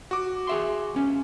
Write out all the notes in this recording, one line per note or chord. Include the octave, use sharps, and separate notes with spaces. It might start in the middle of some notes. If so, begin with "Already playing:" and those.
F#4 D6
G#4 E5 C6
C#2 C#4